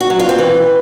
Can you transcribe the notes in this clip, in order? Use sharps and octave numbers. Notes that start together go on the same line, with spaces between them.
F#4
F#3
F4
C4
E3